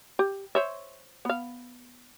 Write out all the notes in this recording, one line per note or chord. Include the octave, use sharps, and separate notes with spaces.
G4
C5 C#5 E5
B3 F5